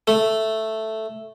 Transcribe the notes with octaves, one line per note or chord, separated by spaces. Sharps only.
A3